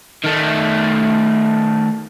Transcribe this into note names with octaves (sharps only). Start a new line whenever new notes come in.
D#3 A3